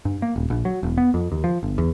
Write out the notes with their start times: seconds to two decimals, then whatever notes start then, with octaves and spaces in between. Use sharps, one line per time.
0.05 G2
0.22 A#3
0.36 D#1
0.50 A#1
0.65 F#3
0.83 E1
0.98 B3
1.14 F2
1.32 D#2
1.44 F3
1.63 G1
1.78 E2